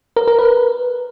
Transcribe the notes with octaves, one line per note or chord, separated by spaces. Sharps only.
A#4
A#4
B4